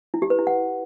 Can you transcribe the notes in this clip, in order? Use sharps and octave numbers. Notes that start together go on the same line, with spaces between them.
E4
G4
B4
E4
F#5